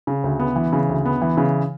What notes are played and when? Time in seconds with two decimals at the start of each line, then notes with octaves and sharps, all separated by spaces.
0.07 C#3
0.24 D2
0.40 B3
0.56 E3
0.73 C#3
0.89 D2
1.05 B3
1.22 E3
1.37 C#3